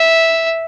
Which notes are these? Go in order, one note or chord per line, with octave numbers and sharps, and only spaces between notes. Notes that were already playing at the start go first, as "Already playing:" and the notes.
Already playing: E5